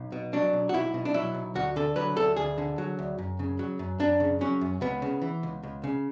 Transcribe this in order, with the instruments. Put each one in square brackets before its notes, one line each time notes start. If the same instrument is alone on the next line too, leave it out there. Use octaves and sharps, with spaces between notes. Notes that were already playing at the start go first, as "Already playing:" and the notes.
Already playing: [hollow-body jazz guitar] B1
B2
F#3 D4
B1
F#4
B1 E4
B2
D4
F#3 E4
B1
D2 F#4
D3 A4
F#3 B4
D2 A4
D2 G#4
D3
F#3
D2
F#2
C#3
F#3
F#2
F#2 D4
C#3
F#3 C#4
F#2
C#2 B3
C#3
E3
C#2
C#2
C#3